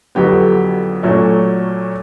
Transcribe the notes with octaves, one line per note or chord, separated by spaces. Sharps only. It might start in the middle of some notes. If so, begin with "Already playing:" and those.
F2 D3 F#3 B3 G4
A#2 F#3 A3 C#4